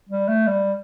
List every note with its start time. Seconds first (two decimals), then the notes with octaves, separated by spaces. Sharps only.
0.09 G3
0.29 A3
0.47 G3